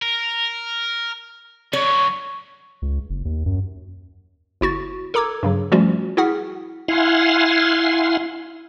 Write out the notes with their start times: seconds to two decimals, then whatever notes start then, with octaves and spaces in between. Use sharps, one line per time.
0.02 A#4
1.73 D3 F#3 C#5
2.82 C#2
3.10 F#1
3.25 D#2
3.46 F#2
4.61 G1 E4 F#4 A6
5.14 A4 A#4 A#5 D6 E6 G#6
5.43 G2 C#3 F#3
5.72 F3 G3 A3 C#4 F4 F#4
6.17 E4 F#4 G#4 F#5 F6 B6
6.88 E4 F5 F#5 G#5 C6